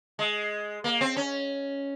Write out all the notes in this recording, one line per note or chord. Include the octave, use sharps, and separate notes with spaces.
G#3
A#3
C4
C#4